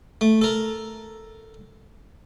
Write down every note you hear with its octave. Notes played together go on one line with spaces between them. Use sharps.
A3
A4 A#4